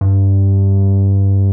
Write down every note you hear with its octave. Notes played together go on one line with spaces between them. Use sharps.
G2